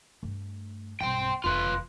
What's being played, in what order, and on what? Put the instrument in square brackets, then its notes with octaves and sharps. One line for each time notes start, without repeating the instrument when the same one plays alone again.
[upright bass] G2 A3
[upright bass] B1 G2 [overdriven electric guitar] C5 G5
[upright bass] F1 E2 [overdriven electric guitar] F4 B4